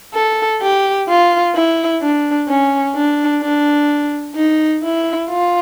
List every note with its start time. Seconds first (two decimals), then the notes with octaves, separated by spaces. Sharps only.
0.14 A4
0.61 G4
1.08 F4
1.55 E4
2.02 D4
2.49 C#4
2.95 D4
3.42 D4
4.36 D#4
4.83 E4
5.29 F4